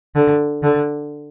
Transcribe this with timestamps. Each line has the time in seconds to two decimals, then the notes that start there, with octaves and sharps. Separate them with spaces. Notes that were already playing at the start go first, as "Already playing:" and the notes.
0.15 D3
0.63 D3